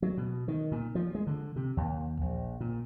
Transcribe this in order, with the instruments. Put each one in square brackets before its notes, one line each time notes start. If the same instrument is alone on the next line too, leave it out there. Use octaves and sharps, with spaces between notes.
[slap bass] F#3
B2
D#3
A#2
F3
G#3
D3
C3
D#2
A#1
A#2